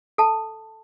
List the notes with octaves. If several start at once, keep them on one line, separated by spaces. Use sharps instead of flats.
A4 A5